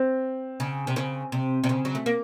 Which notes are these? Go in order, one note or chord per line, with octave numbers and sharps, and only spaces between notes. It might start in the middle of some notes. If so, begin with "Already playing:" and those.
Already playing: C4
C#3
C3
C#3
C3
C3
C#3
F#3
A3
A#3